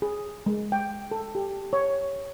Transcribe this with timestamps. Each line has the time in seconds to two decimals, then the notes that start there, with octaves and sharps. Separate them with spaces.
0.02 G#4
0.46 G#3
0.72 G5
1.11 A4
1.35 G4
1.73 C#5